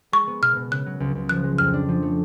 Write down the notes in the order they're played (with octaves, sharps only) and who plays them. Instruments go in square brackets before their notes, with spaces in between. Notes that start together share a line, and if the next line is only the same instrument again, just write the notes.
[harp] G#3 [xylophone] C#6
[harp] B3
[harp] B2 [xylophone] F6
[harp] B2
[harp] C#3 [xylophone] F#6
[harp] F#3
C#2
C#2
[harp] F3 [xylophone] F#6
[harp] G#3
[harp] F2 [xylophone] F6
[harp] D4
F3
A3